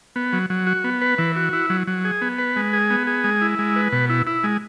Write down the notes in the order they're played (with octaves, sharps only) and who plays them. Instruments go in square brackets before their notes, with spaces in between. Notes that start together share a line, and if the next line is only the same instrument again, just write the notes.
[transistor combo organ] B3
F#3
F#3
F#4
B3
B4
E3
F#4
E4
F#3
F#3
G#4
B3
B4
G#3
G#4
B3
G#4
G#3
E4
G#3
B4
B2
E4
E4
G#3